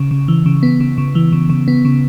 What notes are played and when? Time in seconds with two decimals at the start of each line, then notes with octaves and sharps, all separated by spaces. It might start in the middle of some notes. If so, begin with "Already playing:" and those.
Already playing: C#3
0.11 C#3
0.28 E3
0.46 C#3
0.63 B3
0.80 C#3
0.98 C#3
1.15 E3
1.33 C#3
1.50 C#3
1.68 B3
1.85 C#3